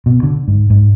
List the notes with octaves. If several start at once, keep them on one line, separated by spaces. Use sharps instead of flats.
B2
D3
G#2
G#2